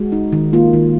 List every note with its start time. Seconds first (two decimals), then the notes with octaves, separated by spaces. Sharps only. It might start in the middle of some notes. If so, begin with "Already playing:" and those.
Already playing: G#3 F#4
0.12 D#4
0.32 D#3
0.53 A#3 F4
0.73 D#3